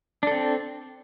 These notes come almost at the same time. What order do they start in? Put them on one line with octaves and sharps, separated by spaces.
D4 A4 C4